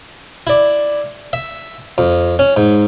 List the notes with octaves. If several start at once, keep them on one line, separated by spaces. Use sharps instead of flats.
E4 D5
E5
F2
C#4
G#2